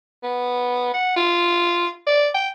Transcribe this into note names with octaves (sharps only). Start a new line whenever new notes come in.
B3
F#5
F4
D5
G5